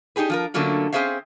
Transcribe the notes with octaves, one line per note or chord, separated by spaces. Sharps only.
D4 D#4 G4 G#4 B4
F3 F4 A#4
D3 F#3 A3 A#3 C#4 F4
C4 C#4 G#4 C5 E5 F5